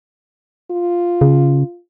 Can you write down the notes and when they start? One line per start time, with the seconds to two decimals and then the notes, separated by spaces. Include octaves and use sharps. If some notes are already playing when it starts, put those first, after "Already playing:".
0.71 F4
1.21 C#3